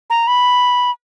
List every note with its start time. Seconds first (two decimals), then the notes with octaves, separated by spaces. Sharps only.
0.10 A#5
0.27 B5